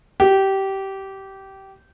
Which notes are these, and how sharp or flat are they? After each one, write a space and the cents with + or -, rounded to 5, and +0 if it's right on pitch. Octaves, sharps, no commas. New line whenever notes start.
G4 -20